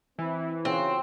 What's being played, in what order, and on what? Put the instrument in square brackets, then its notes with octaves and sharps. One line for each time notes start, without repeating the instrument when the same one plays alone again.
[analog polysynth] E3 [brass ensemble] C4 E4
[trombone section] C#3 [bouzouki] C4 [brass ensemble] F4 F#4